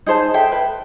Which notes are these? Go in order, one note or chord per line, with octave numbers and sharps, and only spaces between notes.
D#4 G#4 C5 A5
A4 E5 G5
B4